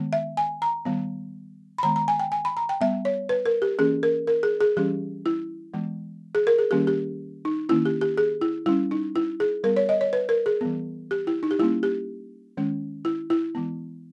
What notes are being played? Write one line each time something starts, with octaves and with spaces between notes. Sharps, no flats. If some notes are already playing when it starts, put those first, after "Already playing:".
Already playing: D#3 G#3 B3
E5
G#5
A#5
D#3 G3 B3
B5
D#3 G#3 B3 A#5
A#5
G#5
G5
G#5
B5
A#5
G5
G3 B3 E5
C#5
B4
A#4
G4
E3 A#3 C#4 G#4
A#4
A#4
G#4
G#4
E3 G3 C#4 G4
E4
E3 G#3 B3
G#4
A#4
G#4
D#3 G3 A#3 C#4 G4
G4
D#4
D#3 A#3 C#4 E4
G4
G4
G#4
E4
G3 C#4 E4
D#4
E4
G#4
G3 B3 A#4
C#5
D#5
C#5
B4
A#4
G#4
E3 G3 B3
G4
E4
D#4
G4
G3 A#3 C#4 E4
G4
D#3 G#3 C#4
E4
E4
E3 G#3 B3